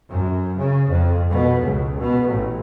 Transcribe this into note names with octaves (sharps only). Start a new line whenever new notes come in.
F#2
C#3
F2
B2
C#2
B2
A1